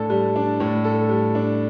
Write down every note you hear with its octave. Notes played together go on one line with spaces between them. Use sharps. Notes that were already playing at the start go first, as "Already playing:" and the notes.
Already playing: A2 D4 A4
G3
D4
A2
A4
G3
D4